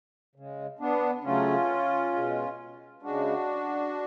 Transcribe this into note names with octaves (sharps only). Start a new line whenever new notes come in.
C#3 G#3
B3 D4
C#3 F#3 A3 C#4 F4
B2 G#3
C#3 G#3 D4 F#4